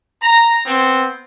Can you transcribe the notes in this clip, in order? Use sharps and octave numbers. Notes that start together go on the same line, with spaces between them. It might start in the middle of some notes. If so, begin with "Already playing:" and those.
A#5
B3 C4